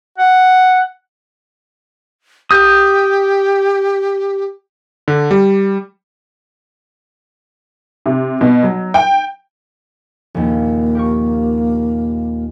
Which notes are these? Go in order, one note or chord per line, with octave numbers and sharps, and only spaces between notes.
F#5
G4 D#6 G6
D3
G3
C3
B2
F#3
G5
A#1 D#2 A#3
G4 A#4 C#6